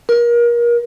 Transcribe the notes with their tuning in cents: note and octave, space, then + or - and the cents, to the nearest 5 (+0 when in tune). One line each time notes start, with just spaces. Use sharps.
A#4 +30